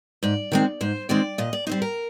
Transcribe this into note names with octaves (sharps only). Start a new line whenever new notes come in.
G#2 D5
D#3 G#3 C4
G#2 C5
D#3 G#3 C4 D5
A#2 D#5
D5
G3 C4 D#4 C5
A#4